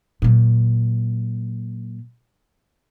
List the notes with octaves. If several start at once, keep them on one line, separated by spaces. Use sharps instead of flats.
A#2 F#3